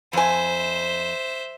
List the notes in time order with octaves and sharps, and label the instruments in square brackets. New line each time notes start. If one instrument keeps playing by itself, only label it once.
[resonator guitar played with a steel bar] F2 G#5 [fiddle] C5 E5